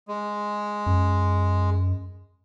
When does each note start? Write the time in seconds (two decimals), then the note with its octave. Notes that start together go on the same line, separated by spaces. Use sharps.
0.08 G#3
0.86 F#2